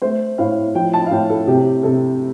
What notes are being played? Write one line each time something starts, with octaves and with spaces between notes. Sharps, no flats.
A3 C5
A2 F5
F3 G5
A5
F5
A2 G5
A4
C3 G4
C3 A4